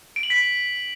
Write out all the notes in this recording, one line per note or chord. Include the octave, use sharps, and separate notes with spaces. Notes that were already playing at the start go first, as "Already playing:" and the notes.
D7
F#7
B6